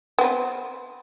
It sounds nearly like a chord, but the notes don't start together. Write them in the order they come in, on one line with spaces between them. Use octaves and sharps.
B3 C4 B4